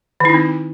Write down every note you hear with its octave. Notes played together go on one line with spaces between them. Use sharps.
D#3 C4 D#4 E4